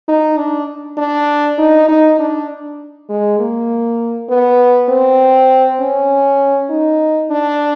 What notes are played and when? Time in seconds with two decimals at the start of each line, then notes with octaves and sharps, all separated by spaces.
0.08 D#4
0.38 D4
0.98 D4
1.58 D#4
1.89 D#4
2.19 D4
3.09 G#3
3.40 A#3
4.30 B3
4.89 C4
5.80 C#4
6.70 D#4
7.30 D4